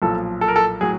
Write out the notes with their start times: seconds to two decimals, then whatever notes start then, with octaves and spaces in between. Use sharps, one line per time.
0.02 B1 A#2 F3 A4
0.41 A4
0.48 A#4
0.56 A4
0.81 A2 F#3 G#4